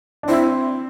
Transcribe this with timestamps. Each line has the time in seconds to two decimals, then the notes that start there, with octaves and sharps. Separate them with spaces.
0.23 D4
0.28 C4 E4